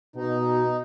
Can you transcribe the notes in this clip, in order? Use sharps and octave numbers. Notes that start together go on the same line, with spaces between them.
B2 D#4